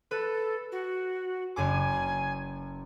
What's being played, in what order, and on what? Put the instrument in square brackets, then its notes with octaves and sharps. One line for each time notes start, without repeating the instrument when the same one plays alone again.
[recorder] A4 [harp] B4
[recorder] F#4
[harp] F#1 F#2 D6 [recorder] G#5